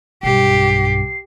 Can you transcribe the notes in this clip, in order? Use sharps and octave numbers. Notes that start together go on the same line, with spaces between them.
B1 G2 G4 C7